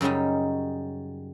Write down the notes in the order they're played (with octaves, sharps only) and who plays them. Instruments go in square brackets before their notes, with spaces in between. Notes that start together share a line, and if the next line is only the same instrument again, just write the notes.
[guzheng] F#2 C#3 G3 C#4 D#4